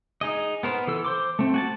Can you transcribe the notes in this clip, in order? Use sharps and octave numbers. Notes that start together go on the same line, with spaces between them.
D#4 G#4 D#5
B3 A#4 C5
E3 A4 E6
C5 C6 D6
A3 C4
F#4 G#5 A5